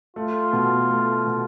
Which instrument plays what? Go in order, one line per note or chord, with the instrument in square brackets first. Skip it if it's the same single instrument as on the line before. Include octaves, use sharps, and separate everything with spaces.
[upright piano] A3 [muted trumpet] F4
[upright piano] B2
A3
B2